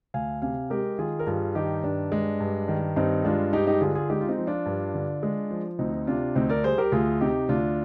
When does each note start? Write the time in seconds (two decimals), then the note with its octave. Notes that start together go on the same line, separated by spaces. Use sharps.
0.14 D2 F5 G#5
0.42 C3 F5 G#5
0.70 G#3 G4 A#4
0.98 D#3 F4 G#4
1.19 A#4
1.26 G2 F4 G#4
1.55 D#3 D#4 G4
1.83 G2 D4
2.12 G#3
2.40 G2
2.68 D#3
2.96 G2 C4 D#4
3.25 G#3 D4 F4
3.53 G2 D#4 G4
3.67 D#4 G4
3.81 D3 F4 G#4
3.95 F4 G#4
4.09 G#3 D#4 G4
4.21 F4
4.28 C4 D#4
4.38 F3
4.47 D4 F4
4.66 G2
4.94 D3
5.23 G#3
5.51 F3
5.79 D2 C4 D#4
6.07 C3 D4 F4
6.35 D2 C4 D#4
6.49 A#4 D5
6.64 G3 G#4 C5
6.78 G4 A#4
6.92 D2 F4 G#4
7.21 C3 D#4 G4
7.49 D2 D4 F4